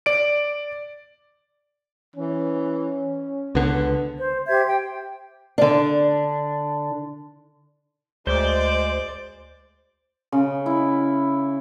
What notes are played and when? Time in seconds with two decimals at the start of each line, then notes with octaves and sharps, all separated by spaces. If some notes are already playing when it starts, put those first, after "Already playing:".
0.06 D5 D7
2.16 E3 C#4
3.55 C#2 D3 B3
4.17 C5
4.48 G4 C5 E5 G#6
4.68 G5
5.58 D3 D4
8.27 D2 G#3 C5 D5
10.32 C#3
10.66 E4